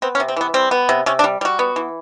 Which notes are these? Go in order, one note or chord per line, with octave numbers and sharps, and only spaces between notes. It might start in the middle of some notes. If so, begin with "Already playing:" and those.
B3 C4
C#4
C3
C4
E3 B3
G3 C4
B3
C3
C3 C#4
D4
G3
G3 F#4
B3
E3